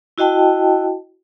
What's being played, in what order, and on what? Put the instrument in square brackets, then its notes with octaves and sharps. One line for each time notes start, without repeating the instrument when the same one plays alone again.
[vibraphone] E4 F#4 D#5 G5 A5